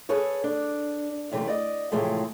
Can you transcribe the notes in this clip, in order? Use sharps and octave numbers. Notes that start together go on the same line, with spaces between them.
G#4 A4 B4 C#5
D4
F#2 C3 E3 A3
D5 D#5
A2 C3 E3 F3 G#3 A3